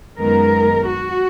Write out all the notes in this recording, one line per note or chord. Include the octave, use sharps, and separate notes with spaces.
F#2 D#3 G#3 B3 A#4
F#4